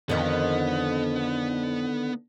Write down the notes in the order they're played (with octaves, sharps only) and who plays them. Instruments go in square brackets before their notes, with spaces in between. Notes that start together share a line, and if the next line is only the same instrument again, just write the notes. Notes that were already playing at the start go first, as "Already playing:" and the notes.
[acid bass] F2 [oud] D3 D#3 [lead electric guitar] B3